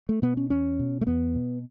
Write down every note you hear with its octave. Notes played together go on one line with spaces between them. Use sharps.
A3
B2 B3
C#4
E2 C#4
B2
A3
E2 B3
B2